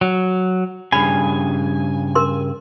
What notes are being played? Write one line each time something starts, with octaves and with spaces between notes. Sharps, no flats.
F#3
G2 C#3 G#5 B5
A#4 C6